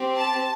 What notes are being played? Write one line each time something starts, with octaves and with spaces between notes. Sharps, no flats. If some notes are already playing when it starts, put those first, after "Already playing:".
Already playing: C4 G4
A5